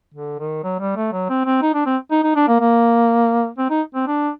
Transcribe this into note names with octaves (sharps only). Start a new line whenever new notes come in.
D3
D#3
F#3
G3
A3
F#3
C4
C4
D#4
D4
C4
D#4
D#4
D4
A#3
A#3
C4
D#4
C4
D4